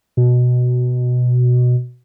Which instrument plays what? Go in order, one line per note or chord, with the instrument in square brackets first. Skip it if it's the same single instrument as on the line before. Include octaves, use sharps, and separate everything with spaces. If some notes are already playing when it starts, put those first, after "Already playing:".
[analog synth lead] B2